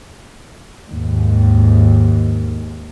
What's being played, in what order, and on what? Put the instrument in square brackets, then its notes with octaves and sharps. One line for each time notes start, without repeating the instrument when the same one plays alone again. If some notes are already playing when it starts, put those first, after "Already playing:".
[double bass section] D#2 G#2